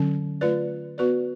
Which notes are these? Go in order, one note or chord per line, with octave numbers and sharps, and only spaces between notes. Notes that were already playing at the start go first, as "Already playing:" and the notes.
Already playing: D3 F#3 C#4
A3 F4 B4 D5
B3 F#4 B4 D5